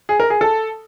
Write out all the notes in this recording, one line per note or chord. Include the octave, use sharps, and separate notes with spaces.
G#4
A#4
G#4
A4